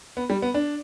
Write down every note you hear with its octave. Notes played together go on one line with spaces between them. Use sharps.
B3
G3
B3
D4